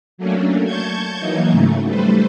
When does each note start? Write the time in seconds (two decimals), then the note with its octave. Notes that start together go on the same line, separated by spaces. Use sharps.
0.18 F#3 A3 A#3 C#4 D4
0.65 A5 C#6 G6 G#6
1.19 E3 F#3 A#3 D#4
1.50 G#2 C#3 F#3 A3
1.87 G3 A3 A4 B4 C5